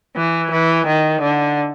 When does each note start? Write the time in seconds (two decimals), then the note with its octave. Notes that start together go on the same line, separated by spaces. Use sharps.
0.16 E3
0.51 E3
0.87 D#3
1.22 D3